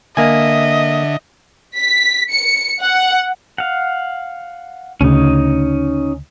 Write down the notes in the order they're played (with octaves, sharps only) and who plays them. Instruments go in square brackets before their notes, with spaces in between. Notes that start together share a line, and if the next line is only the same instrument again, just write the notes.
[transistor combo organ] D3 [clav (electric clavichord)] A#3 G#5 [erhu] D#5 [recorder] E5
[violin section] B6
C#7
F#5
[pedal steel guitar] F5 F#5
[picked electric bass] D2 C#3 [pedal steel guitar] C#4 D#4